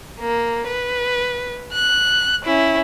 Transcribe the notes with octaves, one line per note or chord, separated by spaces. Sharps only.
A#3
B4
F#6
C#4 E4